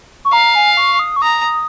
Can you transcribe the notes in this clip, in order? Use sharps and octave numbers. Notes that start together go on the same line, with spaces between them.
C#6
F5 A#5
G#5
C#6
C#6
D#6
C#6
A#5 D#6